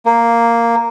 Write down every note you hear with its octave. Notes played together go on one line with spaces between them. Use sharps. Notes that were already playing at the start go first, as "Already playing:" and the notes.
A#3